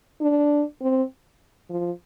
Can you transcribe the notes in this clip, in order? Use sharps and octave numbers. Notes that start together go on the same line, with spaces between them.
D4
C4
F3